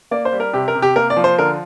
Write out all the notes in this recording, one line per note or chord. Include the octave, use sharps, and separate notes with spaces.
A#3 D5
C5
G3
A#4
C3 G4
A#4
C3
G4
A#3 A#4
D5
F3
C5
D3 A#4